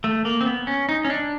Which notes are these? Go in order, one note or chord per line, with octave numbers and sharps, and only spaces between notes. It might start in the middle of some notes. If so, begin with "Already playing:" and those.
A3
A#3
C4
B3
C#4
D#4
C#4
D4